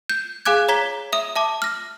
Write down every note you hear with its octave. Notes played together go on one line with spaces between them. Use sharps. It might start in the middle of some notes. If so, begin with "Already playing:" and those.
G6
G#4 F5 G#5 D6 F#6 G#6
C#5 A#5 G#6 B6 G7
E5 D#6
E5 A5 D6
F6 A#6